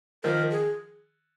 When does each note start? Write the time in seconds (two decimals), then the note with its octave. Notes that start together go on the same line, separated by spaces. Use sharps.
0.24 D#3 F3 A#4
0.51 G#4